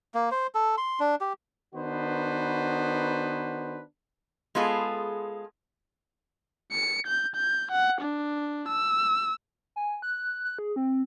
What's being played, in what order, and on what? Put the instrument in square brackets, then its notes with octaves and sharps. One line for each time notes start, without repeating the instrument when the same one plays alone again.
[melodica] A#3
C5
A4
C6
D4
G4
[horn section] D#3 B3 D4 F#4 B4 C5
[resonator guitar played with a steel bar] G#3 B3 F4 G#4 A4
[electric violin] C#7
G6
G6
F#5
D4
E6
[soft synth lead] G#5
F#6
F#6
G#4
C4